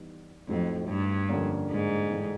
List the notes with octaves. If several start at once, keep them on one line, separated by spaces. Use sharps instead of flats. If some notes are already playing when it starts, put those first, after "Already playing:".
Already playing: E3 G3 B3 D#4
F2 A2 F#3 A3 C4 D#4
G2
F2 D3 G3 A#3 C#4
G#2
A2 E3 A3 D4